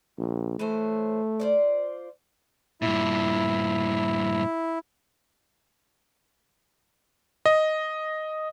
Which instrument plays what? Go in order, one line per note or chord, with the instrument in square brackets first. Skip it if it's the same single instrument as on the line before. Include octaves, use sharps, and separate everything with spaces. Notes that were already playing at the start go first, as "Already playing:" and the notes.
[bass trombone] A#1
[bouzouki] E3 C#4 C5 [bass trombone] A3
[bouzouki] F4 C5 D5
[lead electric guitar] G2 A#2 [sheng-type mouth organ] E4
[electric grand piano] D#5